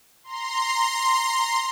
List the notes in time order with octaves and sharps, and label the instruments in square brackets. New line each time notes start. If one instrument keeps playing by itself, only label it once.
[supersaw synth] A#5 C6